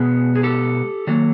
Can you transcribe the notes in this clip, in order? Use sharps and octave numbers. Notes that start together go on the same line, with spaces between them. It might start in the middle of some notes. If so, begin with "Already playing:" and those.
Already playing: B2 G#3 B3 G#4
G#4
G4 A4
D#3 F#3 A#3